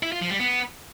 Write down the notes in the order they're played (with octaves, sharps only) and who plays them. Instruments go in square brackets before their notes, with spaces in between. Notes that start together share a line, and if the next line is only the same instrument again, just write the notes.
[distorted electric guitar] E4
F4
F3
G3
B3